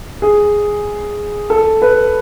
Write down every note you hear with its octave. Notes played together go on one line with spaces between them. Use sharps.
G#4
A4
B4